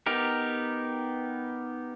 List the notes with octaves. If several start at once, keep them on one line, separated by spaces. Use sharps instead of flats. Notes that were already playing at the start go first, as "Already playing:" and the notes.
B3 D#4 G4 A#4